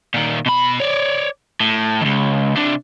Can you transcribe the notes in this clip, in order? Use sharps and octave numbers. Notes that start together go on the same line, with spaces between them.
A#2 D#3
B2 B5
C#5 D5
A2
C#2 D#3
C3 D4